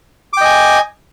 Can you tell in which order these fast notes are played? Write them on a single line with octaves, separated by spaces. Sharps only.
D6 G5 D#5 G#5